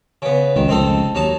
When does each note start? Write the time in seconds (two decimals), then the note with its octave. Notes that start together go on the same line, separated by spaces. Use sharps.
0.22 C#3 B3
0.56 C#2 D#3
0.68 F1 C#2 C4 D#4 A4
1.15 D#2 F#3 D#4 A5